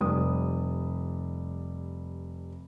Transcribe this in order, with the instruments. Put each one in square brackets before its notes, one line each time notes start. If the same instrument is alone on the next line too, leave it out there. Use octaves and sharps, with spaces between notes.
[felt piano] F1 G3 D#6